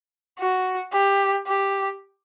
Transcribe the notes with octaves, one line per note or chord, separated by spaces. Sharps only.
F#4
G4
G4